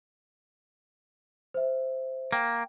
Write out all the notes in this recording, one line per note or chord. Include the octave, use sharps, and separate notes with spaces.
C5 E5
A#3 G5